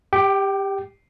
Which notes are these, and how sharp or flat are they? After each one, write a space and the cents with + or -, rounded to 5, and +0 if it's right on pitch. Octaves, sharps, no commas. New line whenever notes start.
G4 +15 G5 -20